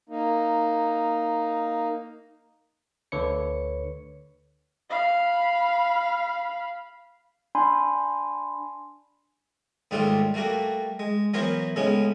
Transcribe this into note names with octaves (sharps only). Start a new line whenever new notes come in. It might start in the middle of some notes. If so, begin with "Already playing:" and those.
A#3 D#4
D2 D3 B4 C#5 C#7
F5 B5
D4 G#5 B5 C6
D#2 G#2 G3 A3 D4 F4
G3 A3 A#3 F#4
G#3
E3 F#3 B3 A#4 C5 C#5
A2 C#3 G#3 B3 C#4